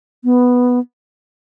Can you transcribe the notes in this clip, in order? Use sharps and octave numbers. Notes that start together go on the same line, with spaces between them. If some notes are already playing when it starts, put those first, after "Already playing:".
B3